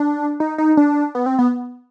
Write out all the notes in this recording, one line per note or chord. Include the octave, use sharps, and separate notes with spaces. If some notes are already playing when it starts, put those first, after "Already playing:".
Already playing: D4
D#4
D#4
D4
B3
C4
B3